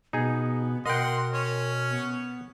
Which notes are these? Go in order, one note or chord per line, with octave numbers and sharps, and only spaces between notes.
B2 B3 D#4 G#4
B2 A#4 D#5 F#5 G5 C6
C#4 C#5
B3